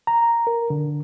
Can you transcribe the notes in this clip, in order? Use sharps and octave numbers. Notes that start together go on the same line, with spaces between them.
A#5
A#4
D3